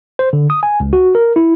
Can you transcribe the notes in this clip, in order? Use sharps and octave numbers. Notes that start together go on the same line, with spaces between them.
C5
D3
D#6
G#5
C#2
F#4
A#4
E4